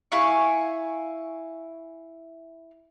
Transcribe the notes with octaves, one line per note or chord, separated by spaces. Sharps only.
E4 F5 G#5 C#6